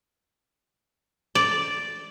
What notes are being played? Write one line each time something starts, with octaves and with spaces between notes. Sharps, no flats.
D5